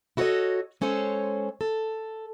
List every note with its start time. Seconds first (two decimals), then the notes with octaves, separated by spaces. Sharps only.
0.17 E4 F#4 A4 A#4 C#5 D#5
0.81 G#3 C#4 A4 C5 C#5
1.61 A4